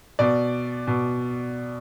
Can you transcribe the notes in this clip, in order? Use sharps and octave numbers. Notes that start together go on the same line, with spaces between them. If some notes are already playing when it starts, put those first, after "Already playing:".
B2 D5
B2